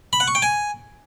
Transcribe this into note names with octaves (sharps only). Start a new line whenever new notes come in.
B5
F#5
C#6
G5
G#5